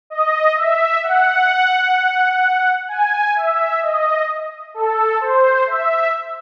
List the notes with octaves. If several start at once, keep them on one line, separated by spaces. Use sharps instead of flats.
D#5
E5
F#5
G#5
E5
D#5
A4
C5
E5